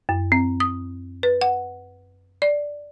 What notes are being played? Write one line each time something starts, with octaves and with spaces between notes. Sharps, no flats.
F#2
C4
D#6
B4
F#5
D5